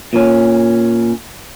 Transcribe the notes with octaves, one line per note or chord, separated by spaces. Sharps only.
A#2 C#4